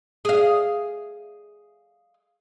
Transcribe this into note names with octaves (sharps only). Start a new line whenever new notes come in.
G#4 F5